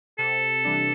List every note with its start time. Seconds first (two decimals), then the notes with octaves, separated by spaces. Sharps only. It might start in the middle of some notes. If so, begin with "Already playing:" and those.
0.19 C3 A4
0.64 E3 G3 D4